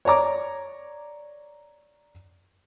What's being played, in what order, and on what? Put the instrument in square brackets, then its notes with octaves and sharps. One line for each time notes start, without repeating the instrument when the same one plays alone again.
[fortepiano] C#5 D5 A#5 D6